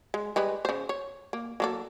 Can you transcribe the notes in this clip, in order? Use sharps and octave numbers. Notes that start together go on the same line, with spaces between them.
G#3
G3 G#3 B4
C#3 C5
C#5
A#3
F#3 A#3 A4